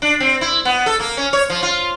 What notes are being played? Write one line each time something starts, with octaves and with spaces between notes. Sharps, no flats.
D4
C4
E4
B3
A4
A#3
C#4
C#5
F3
F4